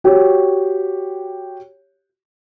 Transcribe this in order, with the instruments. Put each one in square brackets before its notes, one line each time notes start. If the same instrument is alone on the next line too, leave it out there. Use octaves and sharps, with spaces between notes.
[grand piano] F#4 G4 C#5